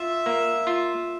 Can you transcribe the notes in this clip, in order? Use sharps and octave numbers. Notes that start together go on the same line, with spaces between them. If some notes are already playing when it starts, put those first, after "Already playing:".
Already playing: F4 E5
A#3
F4